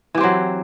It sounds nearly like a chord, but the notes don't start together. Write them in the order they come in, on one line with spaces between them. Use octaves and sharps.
E3 G4 C4 F#3